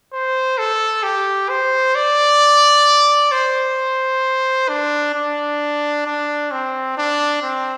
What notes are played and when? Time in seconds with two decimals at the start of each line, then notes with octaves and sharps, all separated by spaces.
0.13 C5
0.58 A4
1.03 G4
1.50 C5
1.95 D5
3.32 C5
4.69 D4
5.15 D4
6.06 D4
6.52 C4
6.97 D4
7.43 C4